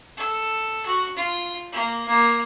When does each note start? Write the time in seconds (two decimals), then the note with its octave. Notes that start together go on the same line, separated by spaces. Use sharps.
0.17 A4
0.86 F#4
1.16 F4
1.72 A#3
2.08 A#3